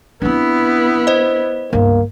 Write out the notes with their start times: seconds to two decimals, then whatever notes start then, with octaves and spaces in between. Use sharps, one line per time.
0.22 B3 C4 D4 E4
1.07 C5 D#5
1.73 G1 C#2 A#3